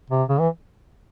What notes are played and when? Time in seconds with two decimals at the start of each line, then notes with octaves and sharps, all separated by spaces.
0.10 C3
0.29 C#3
0.40 E3